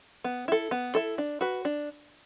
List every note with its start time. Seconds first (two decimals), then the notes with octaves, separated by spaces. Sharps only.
0.24 B3
0.48 E4 A4
0.71 B3
0.95 E4 A4
1.18 D4
1.41 F#4 B4
1.65 D4